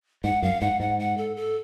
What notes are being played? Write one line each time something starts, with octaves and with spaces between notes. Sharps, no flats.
G#2 F#5
F#2 F5
G#2 F#5
G#2 F#5
F#5
A4
A4